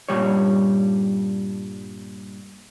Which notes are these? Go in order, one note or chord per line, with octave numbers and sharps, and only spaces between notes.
G2 A#2 G3 C#5